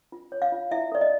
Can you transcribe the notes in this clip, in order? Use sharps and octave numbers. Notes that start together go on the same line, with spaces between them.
F4
C#5
F5
F4
E4 E5
A4 D5
D#5